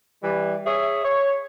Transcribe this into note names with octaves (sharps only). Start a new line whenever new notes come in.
E3 G3
G#4 C#5 E5
C#5